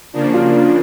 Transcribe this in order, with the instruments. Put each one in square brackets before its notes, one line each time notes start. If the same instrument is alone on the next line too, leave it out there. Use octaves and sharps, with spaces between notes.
[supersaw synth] C#3 F3 A#3 D4
[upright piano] F4